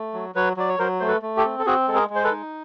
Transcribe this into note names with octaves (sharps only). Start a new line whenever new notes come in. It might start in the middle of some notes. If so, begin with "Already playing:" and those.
Already playing: A3
F#3
F#3 B4 C#5
F#3 D5
C#5
F#3 A#4 C5
A3 C5
A4 B4
A3
G4 A4
C4
A4
C4 F#4 G#4
G#3 A4
G#4 A#4
G#3
C5
A4 B4
D#4